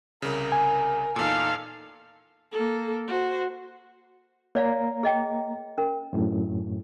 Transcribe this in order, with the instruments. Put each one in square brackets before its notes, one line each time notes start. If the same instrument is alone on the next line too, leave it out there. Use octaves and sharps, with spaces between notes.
[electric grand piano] C2 C#3 [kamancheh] A#4
[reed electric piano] G#5
[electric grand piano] E2 A#2 [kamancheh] D#4 F6 [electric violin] A4 F5
[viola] A#3 A4
F#4 C5
[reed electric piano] A#3 A#5 [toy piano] C#5 D5 F5
[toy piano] G#4 D#5 G5
C#4 A#4
[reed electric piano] F#2 A2